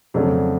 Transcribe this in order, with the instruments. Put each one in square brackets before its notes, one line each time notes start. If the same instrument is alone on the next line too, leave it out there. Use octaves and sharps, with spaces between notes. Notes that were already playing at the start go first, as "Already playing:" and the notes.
[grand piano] F2 C#3 F#3 A3 D4